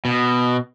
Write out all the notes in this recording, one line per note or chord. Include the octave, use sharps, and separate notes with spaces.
B2